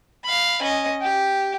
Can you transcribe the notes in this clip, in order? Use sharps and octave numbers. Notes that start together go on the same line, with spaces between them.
F5 B5
C#4 D#5
G4